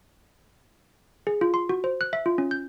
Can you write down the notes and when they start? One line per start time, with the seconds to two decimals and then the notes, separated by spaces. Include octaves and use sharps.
1.27 G#4
1.41 F4
1.54 C6
1.69 F#4
1.84 C5
2.01 F#6
2.13 E5
2.26 F4
2.38 C#4
2.51 G6